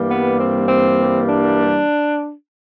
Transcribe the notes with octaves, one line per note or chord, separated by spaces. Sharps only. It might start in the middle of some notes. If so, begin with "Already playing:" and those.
Already playing: G2 E3 G3 A#3
B3
C4
C4
D4